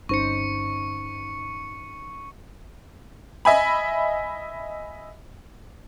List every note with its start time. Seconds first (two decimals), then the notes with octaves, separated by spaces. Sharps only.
0.09 G1 C#4 D#4 C5 C#6 C#7
3.45 D#5 E5 G#5 B5